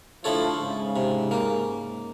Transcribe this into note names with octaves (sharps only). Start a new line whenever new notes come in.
D3 F3 A3 E4 A4 C#5
G#2 C#3
C3
A#3